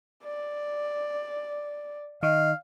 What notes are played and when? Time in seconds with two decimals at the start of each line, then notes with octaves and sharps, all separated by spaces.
0.24 D5
2.23 D#3 D#5 F5